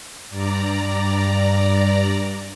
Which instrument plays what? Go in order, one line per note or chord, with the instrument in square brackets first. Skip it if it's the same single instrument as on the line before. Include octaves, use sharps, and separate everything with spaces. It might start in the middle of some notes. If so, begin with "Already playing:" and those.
[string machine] G2 D5 A#5